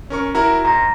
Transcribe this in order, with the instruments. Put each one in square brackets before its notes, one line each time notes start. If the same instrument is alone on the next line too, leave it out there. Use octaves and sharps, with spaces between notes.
[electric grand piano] C#4 A#4 C#6
[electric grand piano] E4 F#4 A#4 [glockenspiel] A#5
[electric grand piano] G#2 [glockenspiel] A#5 A#6